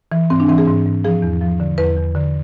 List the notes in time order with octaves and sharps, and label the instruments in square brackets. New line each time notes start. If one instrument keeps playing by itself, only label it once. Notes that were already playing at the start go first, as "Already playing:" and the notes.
[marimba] E3
G#2 C4
D4
E3 C4
G#4
G#2
G#2
F3 G#4
E2
F3
D3
E2 B4
E2
D3